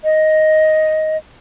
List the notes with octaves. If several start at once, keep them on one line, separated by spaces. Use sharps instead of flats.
D#5